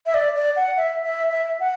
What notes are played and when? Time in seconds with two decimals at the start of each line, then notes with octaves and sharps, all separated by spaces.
0.06 E5
0.14 D5
0.35 D5
0.56 F#5
0.77 E5
1.04 E5
1.32 E5
1.60 F#5